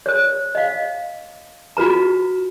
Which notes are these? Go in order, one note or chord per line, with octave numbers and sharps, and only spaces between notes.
C5 C#5
D#5 F5
F4 F#4 B4 A#5